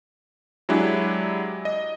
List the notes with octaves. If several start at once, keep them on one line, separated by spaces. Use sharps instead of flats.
F#3 G#3 D4 E4 G4
D#5